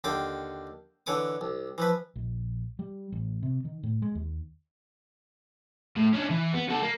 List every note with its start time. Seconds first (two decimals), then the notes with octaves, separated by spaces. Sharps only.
0.04 D#2 D3 F4 G5 D6
1.06 D3 E3 C#5 D6 D#6
1.41 C2
1.78 E3 F3 B4
2.16 A#1
2.79 G3
3.12 A1
3.43 C3
3.65 D#3
3.83 A2
4.02 G#3
4.15 D#2
5.96 A2
6.13 C#4 D4
6.30 E3
6.53 B3
6.69 F#4 A4
6.82 A#3